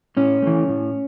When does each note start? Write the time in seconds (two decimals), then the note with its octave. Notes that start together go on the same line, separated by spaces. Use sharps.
0.17 A2 C#4
0.42 E3 A3
0.69 A2